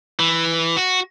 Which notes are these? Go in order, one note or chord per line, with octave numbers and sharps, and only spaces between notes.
E3
F#4